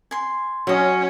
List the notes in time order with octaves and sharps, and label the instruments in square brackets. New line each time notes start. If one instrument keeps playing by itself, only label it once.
[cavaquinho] G#5 C6
[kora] F#3 [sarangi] C#4 [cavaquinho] C#5 D#5